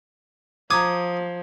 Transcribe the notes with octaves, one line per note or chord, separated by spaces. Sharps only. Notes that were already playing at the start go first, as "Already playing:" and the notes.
F3 A#5 D6 D#6 G#6